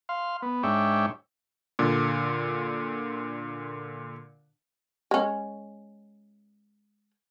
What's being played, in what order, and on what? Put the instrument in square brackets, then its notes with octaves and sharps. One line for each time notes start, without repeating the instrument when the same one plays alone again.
[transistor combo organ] F5 C6
B3
G#2 D4 C#5 E5 G5
[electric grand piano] A#2 D3
[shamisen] G#3 C#4